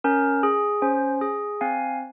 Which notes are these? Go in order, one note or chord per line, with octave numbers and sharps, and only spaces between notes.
C#4 A#4
G#4
C#4 C5
G#4
C4 F5 G#5